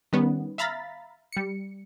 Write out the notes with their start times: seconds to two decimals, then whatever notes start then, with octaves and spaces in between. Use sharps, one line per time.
0.13 D#3 G3 B3 C#4
0.58 E5 F5 A#5 B5 A6 B6
1.32 G3 C#7